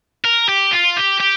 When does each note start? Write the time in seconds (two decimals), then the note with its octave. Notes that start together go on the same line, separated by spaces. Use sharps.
0.24 A#4
0.49 G4
0.72 F4
0.97 G4
1.20 G4